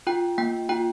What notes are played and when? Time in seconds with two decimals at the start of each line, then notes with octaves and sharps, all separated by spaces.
0.07 F4 G5
0.38 A#3 G5
0.69 F4 G5